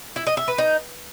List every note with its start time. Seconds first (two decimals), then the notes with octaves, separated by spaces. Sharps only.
0.16 E4
0.27 D#5
0.37 E5
0.48 B4
0.58 D#4